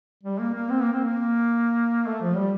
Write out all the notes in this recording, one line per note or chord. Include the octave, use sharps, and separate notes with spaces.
G3
A#3
A#3
C4
A#3
C4
A#3
A3
F3
G3